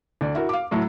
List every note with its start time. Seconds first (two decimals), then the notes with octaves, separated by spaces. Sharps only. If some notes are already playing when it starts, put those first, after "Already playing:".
0.21 D2 D5
0.35 E4 F#4 A#4
0.49 F5 D6
0.71 A2 F#3 A3